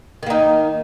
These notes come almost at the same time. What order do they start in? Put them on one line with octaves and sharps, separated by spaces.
D#3 A#3 D#4